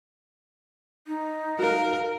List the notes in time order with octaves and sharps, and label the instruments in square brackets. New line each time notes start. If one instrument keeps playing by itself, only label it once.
[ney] D#4
[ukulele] F#4 F5 [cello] A#4